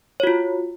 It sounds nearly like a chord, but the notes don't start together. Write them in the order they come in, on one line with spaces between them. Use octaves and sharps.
C#5 F#4 F4